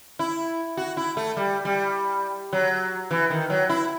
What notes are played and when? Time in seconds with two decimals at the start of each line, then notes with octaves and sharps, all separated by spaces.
0.19 E4
0.77 F#4
0.97 E4
1.17 A3
1.37 G3
1.65 G3
2.53 F#3
3.11 E3
3.30 D#3
3.50 F#3
3.70 E4